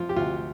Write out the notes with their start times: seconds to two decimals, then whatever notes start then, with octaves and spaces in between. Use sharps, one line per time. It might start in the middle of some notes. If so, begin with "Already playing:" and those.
Already playing: F3 F4
0.09 G4
0.16 D2 F4